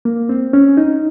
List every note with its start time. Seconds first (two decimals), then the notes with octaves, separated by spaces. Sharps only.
0.05 A#3
0.29 C4
0.53 C#4
0.77 D#4